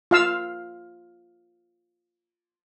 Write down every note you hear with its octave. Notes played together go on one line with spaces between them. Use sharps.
F4 F5 E6